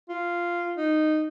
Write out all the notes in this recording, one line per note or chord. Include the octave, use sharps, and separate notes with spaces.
F4
D#4